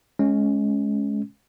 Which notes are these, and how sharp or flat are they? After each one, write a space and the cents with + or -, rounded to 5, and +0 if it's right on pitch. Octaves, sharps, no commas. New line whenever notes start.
G#3 +20 C#4 +0